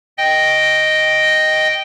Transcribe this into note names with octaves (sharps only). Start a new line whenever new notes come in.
D#5 G5